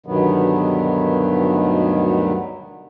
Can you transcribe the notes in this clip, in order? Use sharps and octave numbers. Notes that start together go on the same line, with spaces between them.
D2 G2 B2 D#3 F#3 B3